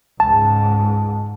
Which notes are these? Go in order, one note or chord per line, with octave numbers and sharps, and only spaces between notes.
C#2 G#2 A5